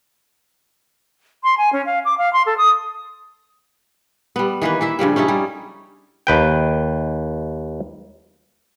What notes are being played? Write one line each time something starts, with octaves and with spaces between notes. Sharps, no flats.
C6
G#5
C#4
F5
D6
F5
C6
A4
D#6
G3 B3
D#3 E3 A#3 B4
E3 E4 E5
G2 C#3 F3 G3
C#4 D#4 E4 A4
G3
D#2 B4 G5